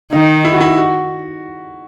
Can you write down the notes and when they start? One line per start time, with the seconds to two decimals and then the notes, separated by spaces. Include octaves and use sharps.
0.13 D#3 D#4
0.45 E4
0.53 F#4
0.61 E4
0.77 F#4